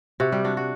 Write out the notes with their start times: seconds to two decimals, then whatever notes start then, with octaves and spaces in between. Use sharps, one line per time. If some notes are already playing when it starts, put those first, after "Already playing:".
0.20 C3 F#4
0.32 G3 G4
0.45 D4 F#4
0.57 F#4